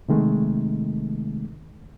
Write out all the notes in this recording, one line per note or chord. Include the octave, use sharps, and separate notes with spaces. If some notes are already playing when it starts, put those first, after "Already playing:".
C3 D#3 G#3 A3